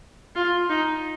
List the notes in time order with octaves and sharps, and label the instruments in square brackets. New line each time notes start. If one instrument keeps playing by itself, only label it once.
[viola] F4
D#4